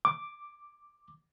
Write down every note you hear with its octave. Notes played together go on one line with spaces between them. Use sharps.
D6